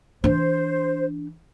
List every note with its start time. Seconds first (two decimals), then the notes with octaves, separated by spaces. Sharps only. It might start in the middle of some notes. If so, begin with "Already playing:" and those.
0.24 E3 D4 C5